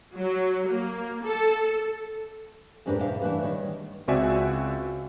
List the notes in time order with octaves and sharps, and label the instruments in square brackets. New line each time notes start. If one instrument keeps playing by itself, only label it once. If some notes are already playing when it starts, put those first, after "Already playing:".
[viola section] F#3
A#3
A4
[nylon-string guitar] F2 G#2 D4 G4 A#4 B4
A2 C3 G4 F5
E3 A3 D4 F#4 B4
D#3 G3 C#5
[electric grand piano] C#2 C4 F#4 D5 E5 G#5